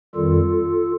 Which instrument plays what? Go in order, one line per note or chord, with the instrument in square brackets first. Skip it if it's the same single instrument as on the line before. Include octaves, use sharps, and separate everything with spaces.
[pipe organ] F2 D#3 G3 F4 A4